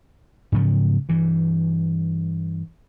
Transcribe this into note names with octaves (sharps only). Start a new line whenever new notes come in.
G#2 C#3 F3 F#3
G2 E3